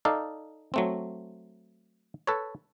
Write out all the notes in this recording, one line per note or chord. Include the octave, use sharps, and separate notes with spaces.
D#4 A4 D5 F5
F#3 A3 C4
A4 B4 C#5